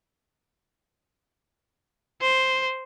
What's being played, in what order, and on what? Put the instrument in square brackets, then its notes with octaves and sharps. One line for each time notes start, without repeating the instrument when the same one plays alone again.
[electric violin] C5